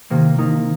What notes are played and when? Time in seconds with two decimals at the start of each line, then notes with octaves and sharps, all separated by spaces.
0.10 C3 D#3 A#3
0.38 D#3 A#3 D#4